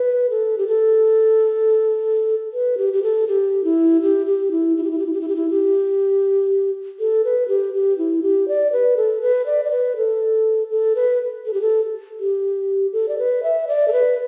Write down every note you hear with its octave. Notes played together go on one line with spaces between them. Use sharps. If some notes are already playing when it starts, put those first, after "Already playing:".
Already playing: B4
A4
G4
A4
B4
G4
G4
A4
G4
E4
G4
G4
E4
E4
G4
E4
G4
E4
G4
E4
G4
E4
G4
A4
B4
G4
G4
E4
G4
D5
B4
A4
B4
D5
D5
B4
A4
A4
B4
A4
G4
A4
G4
A4
D5
B4
E5
D5
A4
B4